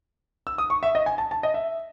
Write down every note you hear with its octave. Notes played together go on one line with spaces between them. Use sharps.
E6
D#6
C#6
E5
D#5
G#5
A5
A5
D#5
E5